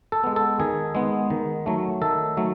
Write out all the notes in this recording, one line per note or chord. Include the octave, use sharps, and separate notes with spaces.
A4
G#3 B3
A4
D#3 G#4
G#3 B3
D#3
F#3 A3
D#3 A4
F#3 A3